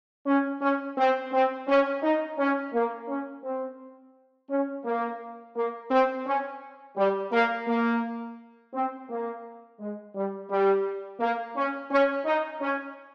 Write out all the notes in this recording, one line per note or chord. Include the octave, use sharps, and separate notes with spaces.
C#4
C#4
C4
C4
C#4
D#4
C#4
A#3
C#4
C4
C#4
A#3
A#3
C4
C#4
G3
A#3
A#3
C4
A#3
G#3
G3
G3
A#3
C#4
C#4
D#4
C#4